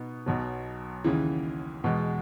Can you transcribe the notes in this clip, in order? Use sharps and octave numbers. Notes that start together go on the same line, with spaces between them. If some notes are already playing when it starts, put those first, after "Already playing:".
Already playing: B2 B3 D#4
B1 B2 F#3
D#2 C#3 E3
E2 B2 G#3